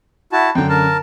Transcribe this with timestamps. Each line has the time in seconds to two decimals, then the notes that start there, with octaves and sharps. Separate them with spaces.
0.32 E4 F#4 A5
0.55 F#2 D3 G5
0.69 A#4 A5